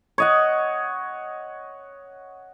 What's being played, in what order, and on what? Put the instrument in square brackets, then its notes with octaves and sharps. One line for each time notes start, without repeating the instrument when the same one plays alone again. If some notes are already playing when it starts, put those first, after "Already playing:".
[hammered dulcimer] C#5 D#5 F#5